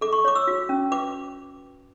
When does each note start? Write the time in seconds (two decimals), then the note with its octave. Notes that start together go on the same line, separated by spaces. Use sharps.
0.01 A4 D6
0.13 C#6
0.25 C#5 D6
0.35 E6
0.47 F#4
0.69 C#4
0.92 B4 D6